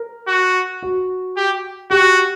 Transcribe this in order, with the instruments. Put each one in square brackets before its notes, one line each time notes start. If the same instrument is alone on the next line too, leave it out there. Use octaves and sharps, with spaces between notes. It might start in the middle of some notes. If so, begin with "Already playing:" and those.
Already playing: [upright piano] A#4
[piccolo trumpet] F#4
[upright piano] F#4
[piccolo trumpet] G4
[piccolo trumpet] F#4 [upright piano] G4